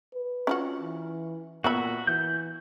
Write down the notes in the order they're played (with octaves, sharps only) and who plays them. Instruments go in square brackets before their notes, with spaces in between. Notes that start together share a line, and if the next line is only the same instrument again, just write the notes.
[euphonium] B4
[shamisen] C#4 F4 F#4
[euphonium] E3
[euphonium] A#2 [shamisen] B3 F4 B5 [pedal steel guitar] F#4 E5
[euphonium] E3 [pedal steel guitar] G6